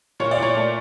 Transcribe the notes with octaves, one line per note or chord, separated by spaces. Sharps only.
A#2 C#5
D5
A#2 C#5
A3